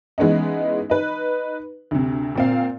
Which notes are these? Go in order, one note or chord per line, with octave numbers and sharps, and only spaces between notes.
E3 G#3 B3 C#4 D#4
D#4 B4
D2 C3
A#2 C4 F5